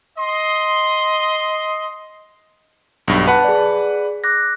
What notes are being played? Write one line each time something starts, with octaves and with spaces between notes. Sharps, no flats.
D#5 C6
B1 G2
B4 F#5 A5 B5
G#4 D5
D6 F#6 A#6